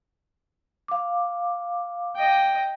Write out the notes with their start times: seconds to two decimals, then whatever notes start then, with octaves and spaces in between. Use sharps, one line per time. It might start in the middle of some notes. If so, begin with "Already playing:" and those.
0.88 F5 D6
2.16 D#5 G5